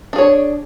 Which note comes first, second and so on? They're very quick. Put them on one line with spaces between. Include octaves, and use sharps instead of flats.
D4 G#4 C#5